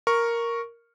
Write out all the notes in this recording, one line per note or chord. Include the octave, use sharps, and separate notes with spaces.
A#4 C#6